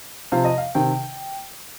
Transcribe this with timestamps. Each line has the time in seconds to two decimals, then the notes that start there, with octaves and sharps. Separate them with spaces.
0.32 C3 F3 F5
0.45 D#5
0.58 F5
0.75 C3 D#3 G5